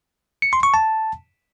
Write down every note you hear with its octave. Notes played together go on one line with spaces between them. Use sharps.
C#7
C6
C#6
A5